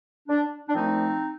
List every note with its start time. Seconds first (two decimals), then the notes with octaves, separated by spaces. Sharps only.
0.28 D4
0.68 D4
0.74 A#2 F3 A3 C4 D#4